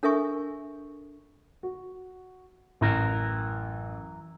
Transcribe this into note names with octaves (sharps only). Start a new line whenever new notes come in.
D4 A4 A#4 E5 G#5 C#6
F#4
A1 F#2 E3 A#4